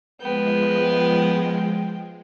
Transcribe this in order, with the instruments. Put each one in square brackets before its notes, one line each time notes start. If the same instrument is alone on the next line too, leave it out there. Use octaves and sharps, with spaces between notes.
[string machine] F3 G#3 [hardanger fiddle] B3 [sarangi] G5